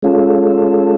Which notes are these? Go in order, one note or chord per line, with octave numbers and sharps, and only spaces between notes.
G#3 C#4 F4 A4